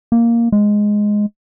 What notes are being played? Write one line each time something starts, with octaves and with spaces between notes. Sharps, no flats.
A#3
G#3